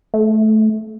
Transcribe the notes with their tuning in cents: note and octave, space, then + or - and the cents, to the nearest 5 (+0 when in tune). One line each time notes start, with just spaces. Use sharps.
A3 -15